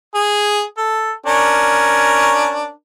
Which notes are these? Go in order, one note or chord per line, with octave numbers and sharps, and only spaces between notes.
G#4
A4
C#4 D4 A#4